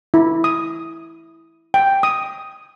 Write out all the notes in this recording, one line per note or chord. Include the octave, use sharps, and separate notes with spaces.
E4
D#6
G5
D#6